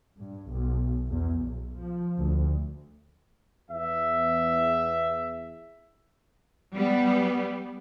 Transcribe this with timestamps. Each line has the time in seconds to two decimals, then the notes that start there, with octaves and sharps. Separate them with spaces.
0.19 G2
0.51 B1
1.10 E2
1.40 B1
1.79 F3
2.18 D2
3.70 E2 E5
6.74 G3 B3